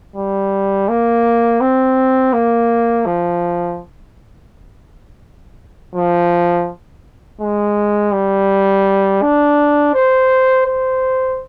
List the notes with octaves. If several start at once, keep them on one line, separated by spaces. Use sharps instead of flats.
G3
A#3
C4
A#3
F3
F3
G#3
G3
D4
C5
C5